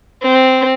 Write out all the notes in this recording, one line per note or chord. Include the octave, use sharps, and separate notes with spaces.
C4